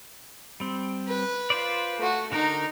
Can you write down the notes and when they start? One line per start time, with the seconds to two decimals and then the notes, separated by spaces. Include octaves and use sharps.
0.60 G3 C4
1.08 B4
1.50 F4 C5 D5
1.98 A3 F#4
2.32 D3 D#4 F#4 A#4